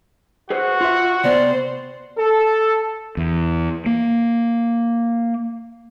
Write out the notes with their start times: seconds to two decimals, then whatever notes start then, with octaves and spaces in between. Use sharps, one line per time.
0.50 F#4 G#4 B4 C5
0.81 F4 E5
1.24 C3 B3 C5 D5
2.18 A4
3.17 E2
3.86 A#3